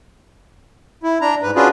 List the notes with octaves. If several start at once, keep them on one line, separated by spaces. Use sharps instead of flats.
E4
D4 A#5
G#2 B4
C#4 D4 F4 F#4 G#4 B4